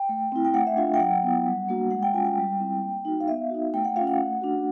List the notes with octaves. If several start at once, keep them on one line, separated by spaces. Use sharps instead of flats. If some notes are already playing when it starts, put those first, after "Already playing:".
Already playing: G5
A3
C4 E4
G5
A3 F#5
E5
D4 F4 F5
G5
F#3 F#5
B3 E4
G3
A#3 D4 F#4
G#3 F#5
G5
C#4 F4 G#5
G5
G3
C4 E4
A#3
D#4 F#4
F5
B3 E5
D#4 F#4
A3 G5
F#5
C#4 F4 F5
F#5
A3
D4 F#4